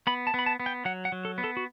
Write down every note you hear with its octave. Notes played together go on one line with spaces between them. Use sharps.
B3 B5
A5
B3 B5
A5
B3
G5
F#3 F#5
F#5
F#3
A4
B3
A4
F#4